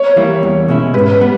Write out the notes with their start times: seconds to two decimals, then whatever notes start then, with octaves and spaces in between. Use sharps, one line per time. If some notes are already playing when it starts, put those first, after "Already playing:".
Already playing: C#5
0.16 E3 G3 A#3 E4
0.43 E2
0.68 B2 G#3 C#4 E4
0.94 G#2 B4
1.20 G3 B3